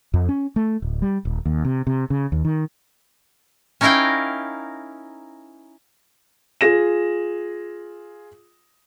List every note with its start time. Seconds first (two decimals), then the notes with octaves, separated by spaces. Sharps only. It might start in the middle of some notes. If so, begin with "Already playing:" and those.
0.14 F2
0.29 C#4
0.56 A3
0.82 D1
1.02 G3
1.25 D#1
1.45 D#2
1.65 C3
1.87 C3
2.10 C#3
2.32 D#2
2.45 D#3
3.81 C#4 D#4 E4 A#4 F5 G5
6.61 F4 G#4 A#6 E7